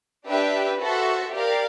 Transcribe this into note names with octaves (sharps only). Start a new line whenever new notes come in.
D4 G4 B4 E5 G5
F#4 A4 C5 E5
G4 A#4 D5 F5